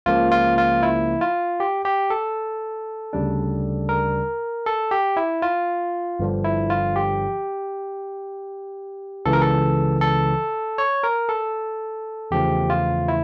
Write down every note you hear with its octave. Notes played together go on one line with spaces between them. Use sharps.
C#2 C#3 F3 A#3 F4
F4
F4
E4
F4
G4
G4
A4
D2 C#3 G3 D4
A#4
A4
G4
E4
F4
G1 G2 D3 F3
E4
F4
G4
C#2 C#3 E3 A4
A#4
A4
A4
C#5
A#4
A4
E2 C#3 F3 A3 G4
F4
E4